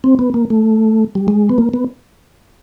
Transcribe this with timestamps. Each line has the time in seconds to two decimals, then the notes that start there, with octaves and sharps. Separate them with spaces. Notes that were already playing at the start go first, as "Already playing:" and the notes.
0.04 C4
0.19 B3
0.34 A#3
0.50 A3
1.15 G3
1.28 G#3
1.49 B3
1.58 A#3
1.74 B3